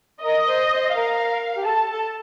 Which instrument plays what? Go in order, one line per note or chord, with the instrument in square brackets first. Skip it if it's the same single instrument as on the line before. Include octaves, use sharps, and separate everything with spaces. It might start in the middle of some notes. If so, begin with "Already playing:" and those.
[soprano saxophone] A#4 [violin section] D#5
[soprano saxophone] C5
C5
[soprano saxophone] A#4 [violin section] F5
[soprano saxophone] G4
[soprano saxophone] A4 [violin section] A5
[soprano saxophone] A4